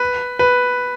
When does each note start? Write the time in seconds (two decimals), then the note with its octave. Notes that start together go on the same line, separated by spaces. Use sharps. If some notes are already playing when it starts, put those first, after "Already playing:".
Already playing: B4
0.39 B4